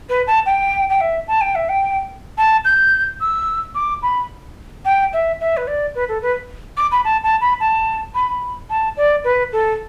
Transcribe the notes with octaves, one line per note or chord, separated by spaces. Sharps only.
B4
A5
G5
G5
E5
A5
G5
E5
G5
A5
G6
E6
D6
B5
G5
E5
E5
B4
D5
B4
A4
B4
D6
B5
A5
A5
B5
A5
B5
A5
D5
B4
A4